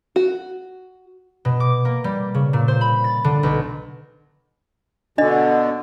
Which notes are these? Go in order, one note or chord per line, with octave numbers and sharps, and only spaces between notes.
F#4
B2
D6
A#3
G3
C#3
A#2
C5
B5
A6
D3
B1
B2 D3 D4 D#5